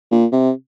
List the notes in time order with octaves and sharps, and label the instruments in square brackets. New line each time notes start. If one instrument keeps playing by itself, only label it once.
[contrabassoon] A#2
C3